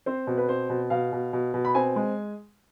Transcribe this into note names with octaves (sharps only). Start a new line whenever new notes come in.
C4 C5
B2
B4
C4 C5
B2
B2 F5
B2
B2
B2
B5
C4 G#5
G#3